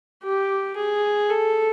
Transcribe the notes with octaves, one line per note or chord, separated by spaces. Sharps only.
G4
G#4
A4